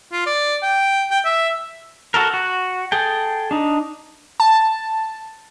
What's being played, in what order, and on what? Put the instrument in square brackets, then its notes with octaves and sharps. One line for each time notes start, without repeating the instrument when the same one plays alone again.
[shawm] F4
D5
G5
G5
E5
[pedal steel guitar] F#4 A4 A#4
F#4
G#4 A4 G5
D4 D#4
[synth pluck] A5